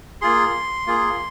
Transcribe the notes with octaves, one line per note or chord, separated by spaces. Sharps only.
A#3 F4 G#4 C6
A#3 F4 G#4